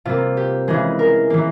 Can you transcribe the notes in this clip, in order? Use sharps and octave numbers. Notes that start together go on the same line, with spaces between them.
C3 G3 A#3 F4
G4
C#3 E3 G#3 G#4
A#4
E3 A#3